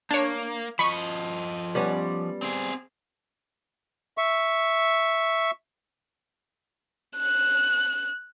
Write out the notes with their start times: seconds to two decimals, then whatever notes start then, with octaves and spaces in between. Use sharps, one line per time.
0.11 A#3 D4 C#5
0.79 F3 D#5 B5 C#6
1.75 G3 B3 C#4
2.42 C4 G#4
4.18 E5 C#6
7.18 F#6